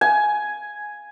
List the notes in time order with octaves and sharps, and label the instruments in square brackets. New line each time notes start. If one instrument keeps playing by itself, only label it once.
[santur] G#5